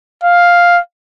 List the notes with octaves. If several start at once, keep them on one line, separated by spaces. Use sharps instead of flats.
F5